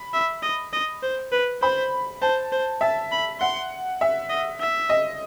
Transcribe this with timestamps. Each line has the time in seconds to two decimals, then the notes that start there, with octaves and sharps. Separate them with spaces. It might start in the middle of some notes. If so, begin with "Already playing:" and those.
Already playing: B5
0.14 E5
0.43 D#5
0.73 D#5
1.03 C5
1.32 B4
1.62 C5 B5
2.22 C5 A5
2.52 C5
2.81 E5 A5
3.12 B5
3.40 F#5 C6
4.01 E5
4.30 D#5
4.60 E5
4.89 D#5